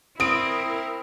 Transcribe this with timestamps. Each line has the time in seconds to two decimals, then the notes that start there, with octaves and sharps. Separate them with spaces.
0.20 C4 E4 A#4 D#6 D7